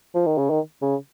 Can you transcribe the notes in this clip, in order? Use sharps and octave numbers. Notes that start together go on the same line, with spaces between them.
F3
D#3
C#3
D#3
C#3